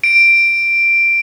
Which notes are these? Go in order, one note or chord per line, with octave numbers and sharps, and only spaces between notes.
D7